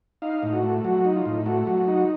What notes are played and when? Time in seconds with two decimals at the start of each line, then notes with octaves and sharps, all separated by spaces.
0.22 D#4 F5
0.43 A2
0.53 F#4
0.63 A3
0.84 F#3 F#4
1.05 D#4
1.16 F4
1.25 A2
1.46 A3 F#4
1.67 F#3 F#4
1.87 D#4 F#4